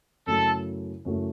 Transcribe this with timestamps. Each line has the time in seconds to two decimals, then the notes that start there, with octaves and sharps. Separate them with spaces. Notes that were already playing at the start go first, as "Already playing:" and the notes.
0.26 F#2 C#3 F#3 A3 E4 A4
1.05 F#2 C#3 F#3 A3 E4